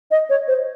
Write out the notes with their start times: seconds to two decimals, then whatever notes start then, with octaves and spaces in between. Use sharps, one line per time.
0.11 D#5
0.30 C#5
0.48 C5